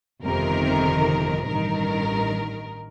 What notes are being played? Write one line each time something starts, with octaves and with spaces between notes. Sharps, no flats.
G1 F2 C3 D#3 A#4
A1 G2 D#3 A#4